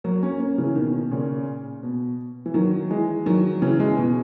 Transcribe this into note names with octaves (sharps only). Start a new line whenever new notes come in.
F#3 A#3
A#3 C#4
A#3 C#4
C#3 E3
B2 D#3
A#2 C#3
B2
E3
D#3 F#3
E3 G#3
D#3 F#3
C#3 E3
E3 G#3
B2